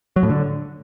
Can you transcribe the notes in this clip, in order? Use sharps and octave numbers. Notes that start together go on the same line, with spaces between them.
F#3
A2
D3